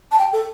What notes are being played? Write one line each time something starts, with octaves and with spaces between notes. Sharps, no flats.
A5
G5
A4